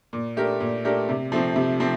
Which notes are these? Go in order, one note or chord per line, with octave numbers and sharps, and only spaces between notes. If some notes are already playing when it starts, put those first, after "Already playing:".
A#2
A3 D4 G4 A#4
A#2
A3 D4 G4 A#4
C3
F3 A3 C4
C3
F3 A3 C4